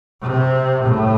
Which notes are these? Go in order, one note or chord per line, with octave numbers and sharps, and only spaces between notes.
C3
A2